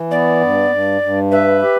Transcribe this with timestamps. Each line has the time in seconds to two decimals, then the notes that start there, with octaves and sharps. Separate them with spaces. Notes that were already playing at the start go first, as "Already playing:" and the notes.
Already playing: E3
0.10 B3 D5
0.41 G2
0.70 G2
1.01 G2
1.31 B4 E5
1.61 G4